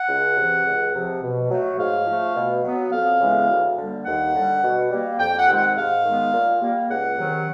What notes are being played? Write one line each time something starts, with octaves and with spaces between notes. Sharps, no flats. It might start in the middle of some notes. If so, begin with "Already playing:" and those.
Already playing: F#5
C#2
C3 E3
C#2
C3 F3
B2
F#3 A3
G#2 F5
F3 A3
B2
F#3 B3
F2 F5
C#3 E3 G#3 B3
D2
D3 G3 A#3
D#2 F#5
D3 G3
B2
G3 A#3
F2 G5
F#5
C3 D#3 G#3
F#5
G#2 F5
D#3 G#3 B3
A#2
G3 A#3
C#2 F#5
C3 D#3 F#3